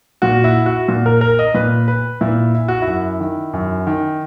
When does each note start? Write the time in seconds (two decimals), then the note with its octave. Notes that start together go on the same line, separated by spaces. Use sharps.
0.22 A#2 F#4
0.44 E4
0.66 F#4
0.88 A#2
1.06 A#4
1.21 A#4
1.39 D#5
1.54 A#2 B4
1.88 B4
2.21 A#2 E4
2.55 E4
2.68 F#4
2.82 E4
2.87 F#2
3.20 D#3
3.53 F#2
3.87 D#3